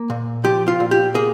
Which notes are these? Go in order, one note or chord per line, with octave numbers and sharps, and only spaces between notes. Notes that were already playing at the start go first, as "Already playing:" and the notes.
Already playing: A#3
A#2
F3 G4
F4
A#2
G4
A#3 G#4